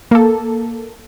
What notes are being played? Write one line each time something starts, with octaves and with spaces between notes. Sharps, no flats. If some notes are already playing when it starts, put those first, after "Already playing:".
A#3 A4